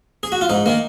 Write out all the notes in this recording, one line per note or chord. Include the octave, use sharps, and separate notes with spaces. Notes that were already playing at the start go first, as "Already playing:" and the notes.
G#4
F#4
F4
G#2 D#4
D#3 A#3